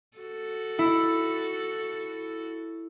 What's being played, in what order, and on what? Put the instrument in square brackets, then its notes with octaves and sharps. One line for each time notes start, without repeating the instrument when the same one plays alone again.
[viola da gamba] F#4 A4
[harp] E4